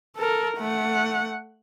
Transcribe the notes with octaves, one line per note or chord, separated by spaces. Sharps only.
A4 A#4
A3 F#5